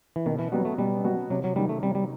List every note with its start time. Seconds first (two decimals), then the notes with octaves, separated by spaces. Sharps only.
0.16 E3
0.26 B2 D#3
0.39 E3
0.52 F#3 G3 B3 F#4
0.65 A3
0.78 B2 G3
1.04 F#3 B3 F#4
1.30 C3 F#3
1.44 F#3
1.56 D#3 F#3 G3
1.69 A3
1.82 C3 G3
1.95 G3